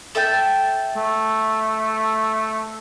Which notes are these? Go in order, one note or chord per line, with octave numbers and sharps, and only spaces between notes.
A4 E5 G5
A3